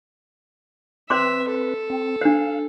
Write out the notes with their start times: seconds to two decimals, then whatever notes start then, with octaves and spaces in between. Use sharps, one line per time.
1.10 C4 B4 C5 E5 C6 D6
1.50 A4
1.90 C4
2.21 D4 C5 F5